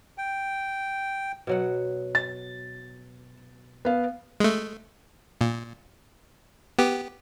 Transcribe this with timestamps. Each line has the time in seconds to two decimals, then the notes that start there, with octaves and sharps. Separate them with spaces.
0.18 G5
1.47 B2 F#3 F#5
2.15 A6
3.85 B3 F5
4.40 G#3 A3
5.41 A#2
6.79 B3 G4